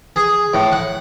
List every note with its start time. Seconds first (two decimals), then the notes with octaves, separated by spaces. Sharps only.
0.16 G#4
0.54 A2
0.72 F#5